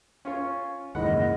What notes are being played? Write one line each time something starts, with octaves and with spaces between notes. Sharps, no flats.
C#4 F4 C#5
F#1 D#2 G#2 C#3 E3 D#5 F#5 B5